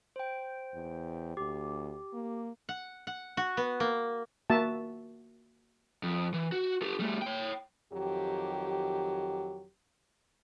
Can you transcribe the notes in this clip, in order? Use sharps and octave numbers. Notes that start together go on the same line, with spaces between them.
C5 G5
E2
D2 G4
A#3
F#5
F#5
F#4
B3
A#3
A#3 F#4 E5 A5
F2
E3
F#4
G4 A4
G3 A3
C#5 G5
F2 D#3 F#3 G4